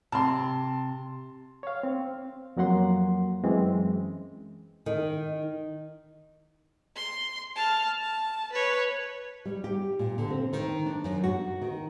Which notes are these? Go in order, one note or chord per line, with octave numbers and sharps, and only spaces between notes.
C3 A5 C6
C#5 F5
C4
F2 F#3 A#3 F#5 C6
F#2 E3 G#3 C4
D#3
C6
A5 F6
A5
B4 C#5
G3
G4
A#2
D3
C4
D#3
D4
F#2
F#4
D#3